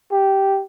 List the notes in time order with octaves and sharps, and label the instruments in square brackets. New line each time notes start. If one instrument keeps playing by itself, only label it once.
[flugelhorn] G4